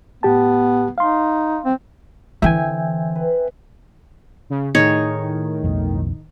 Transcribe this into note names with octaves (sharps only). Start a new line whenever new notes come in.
A2 B3 G4 A5
D#4 F5 C6
C4
D3 E3 C4 E5 G5 G#5
B4
C#3
A2 D#3 D#4 G#4 C#5
B1 F2